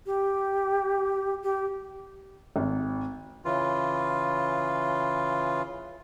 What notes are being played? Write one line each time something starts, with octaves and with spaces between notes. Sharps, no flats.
G4
G4
G#1
C#3 E3 F4